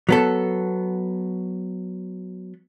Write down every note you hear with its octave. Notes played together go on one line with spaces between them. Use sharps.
F#3 B3 A4